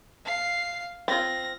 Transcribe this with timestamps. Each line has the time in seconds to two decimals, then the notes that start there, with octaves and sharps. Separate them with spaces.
0.25 F5 C7
1.08 C4 F4 A#6